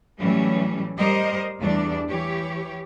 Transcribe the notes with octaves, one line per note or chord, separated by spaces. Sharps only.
A2 E3 F#3 G3 A3 C#4
G3 A#4 C5 D#5
E2 G3 A3 D4 D5
E3 G4 C#5